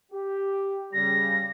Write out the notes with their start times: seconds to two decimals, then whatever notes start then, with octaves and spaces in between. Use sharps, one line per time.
0.12 G4
0.93 C#3 G3 A#6